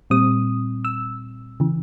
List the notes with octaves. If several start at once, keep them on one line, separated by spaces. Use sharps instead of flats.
A#2 G3 C4 D#6
E6
C#3 E3